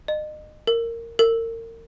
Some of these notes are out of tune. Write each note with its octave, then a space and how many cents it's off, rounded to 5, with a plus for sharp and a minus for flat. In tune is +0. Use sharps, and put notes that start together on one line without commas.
D#5 -35
A#4 -15
A#4 -35